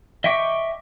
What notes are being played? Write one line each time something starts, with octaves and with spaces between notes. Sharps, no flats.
D#5 E5 G5 C#6 D6